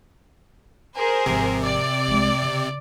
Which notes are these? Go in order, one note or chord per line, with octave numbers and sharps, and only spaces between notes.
G#4 A#4 C5
G#1 C3 F3
D5
C2 G#3
C#3